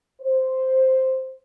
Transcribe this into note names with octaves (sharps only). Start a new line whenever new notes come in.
C5